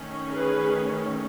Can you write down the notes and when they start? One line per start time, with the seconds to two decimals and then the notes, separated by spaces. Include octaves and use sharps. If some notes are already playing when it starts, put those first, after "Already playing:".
Already playing: D#3 A3 C#4
0.31 G#4 B4